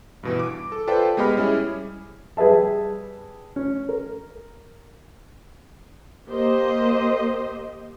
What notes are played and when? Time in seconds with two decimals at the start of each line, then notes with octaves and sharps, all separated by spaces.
0.23 G2 B2 E3
0.39 D6
0.72 A4
0.87 F4 A4 B4 C5 D5 G5
1.17 G#3 B3 G4 D#5 B5 F6
1.37 G3 C#4 E4 G#4
2.37 G3 G#4 B4 E5 A5
3.56 C#4
3.89 A#4
6.29 A#3 G4 C5 D#5